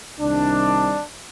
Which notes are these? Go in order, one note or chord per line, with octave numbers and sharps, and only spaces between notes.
C2 C3 D#3 G3 D4